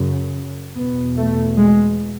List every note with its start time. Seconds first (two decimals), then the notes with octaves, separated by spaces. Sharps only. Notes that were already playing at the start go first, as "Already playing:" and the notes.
Already playing: F#2 C#3
0.75 E2 B2 B3
1.17 A3
1.57 G#3